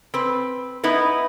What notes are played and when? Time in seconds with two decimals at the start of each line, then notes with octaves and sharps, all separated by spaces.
0.14 C4 B4
0.84 B3 D#4 E4 B4